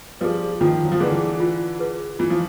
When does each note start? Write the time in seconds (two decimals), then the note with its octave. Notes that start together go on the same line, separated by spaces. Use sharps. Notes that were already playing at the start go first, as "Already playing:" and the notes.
0.21 F3 G3 G#4 B4
0.60 D#3 F3 F4
0.84 F#3
0.92 F3
1.00 D3 E3 G#4 B4
1.40 F4
1.79 G#4 B4
2.19 E3 F4
2.30 F3